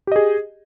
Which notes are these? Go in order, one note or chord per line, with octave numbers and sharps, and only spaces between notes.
G4 G#4 D#5